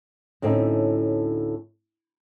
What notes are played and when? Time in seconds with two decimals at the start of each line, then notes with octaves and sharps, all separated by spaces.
0.42 D2 A2 C4 C#4 D#4